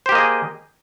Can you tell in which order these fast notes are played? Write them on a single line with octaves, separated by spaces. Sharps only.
C5 G4 A#3 D#5 G#4